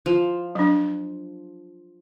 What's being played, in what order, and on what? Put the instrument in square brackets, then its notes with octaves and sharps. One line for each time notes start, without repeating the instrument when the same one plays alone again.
[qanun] F3
[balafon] F#3 D4